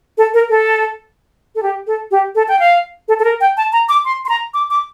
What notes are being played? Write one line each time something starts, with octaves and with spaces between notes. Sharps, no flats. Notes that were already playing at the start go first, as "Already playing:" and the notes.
A4
A#4
A4
A4
G4
A4
G4
A4
G5
F5
A4
A4
A#4
G5
A5
A#5
D6
C6
C6
A#5
D6
D6